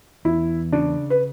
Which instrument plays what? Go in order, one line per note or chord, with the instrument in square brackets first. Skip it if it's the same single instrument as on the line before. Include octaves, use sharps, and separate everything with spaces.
[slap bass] E2 [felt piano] E4
[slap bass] C#3 [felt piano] D4
[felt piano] B4